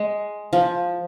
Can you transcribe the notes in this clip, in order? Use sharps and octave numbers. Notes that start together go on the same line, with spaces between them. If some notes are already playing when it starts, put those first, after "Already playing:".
Already playing: G#3
F3